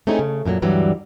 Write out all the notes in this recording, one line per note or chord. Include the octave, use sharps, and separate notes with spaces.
A3 C4 C#4 D#4 E4 G#4
C#3
F#2 A#2 D3 F#3
D2 G2 E3 F#3 G3